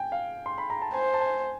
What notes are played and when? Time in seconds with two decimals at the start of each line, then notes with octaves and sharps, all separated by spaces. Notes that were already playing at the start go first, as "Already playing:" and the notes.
Already playing: G5 G#5
0.12 F5
0.46 C6
0.58 B5
0.70 A#5
0.82 A5
0.94 C5 G#5
1.14 A5
1.21 G#5